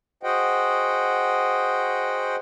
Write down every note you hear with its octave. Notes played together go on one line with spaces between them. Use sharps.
F#4 G#4 C5 D#5 F#5 G5